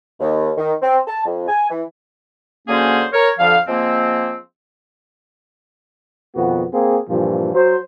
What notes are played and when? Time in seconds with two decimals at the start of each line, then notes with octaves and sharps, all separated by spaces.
0.20 D#2
0.58 D#3
0.82 C4
1.07 A5
1.25 F2
1.48 G#5
1.70 E3
2.67 D3 F#3 A#3 C#4 G#4 C5
3.13 A#4 C#5
3.38 F2 D3 F3 F5
3.67 F3 G#3 A#3 C4
6.35 F2 B2 D#3 B3 F#4
6.73 A#3 C4 G#4
7.09 G2 A#2 E3 F3
7.54 F#3 C5